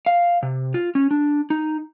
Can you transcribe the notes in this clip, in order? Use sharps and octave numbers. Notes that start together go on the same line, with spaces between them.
F5
C3
F4
C#4
D4
D#4